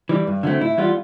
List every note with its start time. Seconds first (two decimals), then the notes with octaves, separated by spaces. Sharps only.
0.09 E3 G3
0.27 G2
0.43 D3 F#3 A3 C4
0.61 A2 E4
0.78 E3 G3 B3 F4